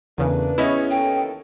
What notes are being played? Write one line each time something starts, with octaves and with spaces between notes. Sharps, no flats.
E2 C#3 A3 A#3 D4 B4
E2 B3 C#4 E4 G#4 C#5 D#5
D#2 E3 A4 G5